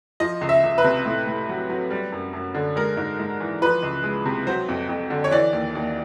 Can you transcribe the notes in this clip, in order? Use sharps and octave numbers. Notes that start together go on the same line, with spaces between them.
F3 D#5
C#2
E5
C#2
B4
C3
A2
A2
F#3
F#3
G3
F#2
F#2
D3
G#3 A#4
G#2
G#2
E3
F3 B4
C#2
G#3
C3
F#3 C5
F2
F2
D3
C#5
E3 D5
D#2
D#2